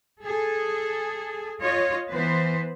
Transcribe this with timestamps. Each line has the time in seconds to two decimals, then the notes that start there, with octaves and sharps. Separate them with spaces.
0.23 G#4 A4
1.61 F4 C#5 D#5
2.10 E3 B3 B4 C5